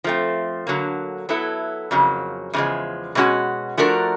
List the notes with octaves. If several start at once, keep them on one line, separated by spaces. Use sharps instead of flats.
F3 A3 C4
D3 F#3 A#3
F#3 B3 E4 A4
F2 C#3 F#3 A#3
E2 C#3 F3 G#3
B2 G#3 C#4 F#4
F3 A3 D4 F#4 A#4